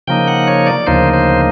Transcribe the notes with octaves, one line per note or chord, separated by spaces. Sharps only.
C#3 F3 A#3 D#4 G5
F#5
C#5
D5
D2 C#3 F3 A#3 D#4 C5
C5